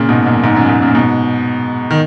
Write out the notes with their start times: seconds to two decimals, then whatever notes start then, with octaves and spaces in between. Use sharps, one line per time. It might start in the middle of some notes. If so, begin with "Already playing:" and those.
Already playing: A#2 C#3
0.09 G#2 B2
0.26 F#2 A#2
0.44 G#2
0.56 F#2
0.69 G#2
0.82 F#2 A#2
0.95 G#2 B2
1.91 D#3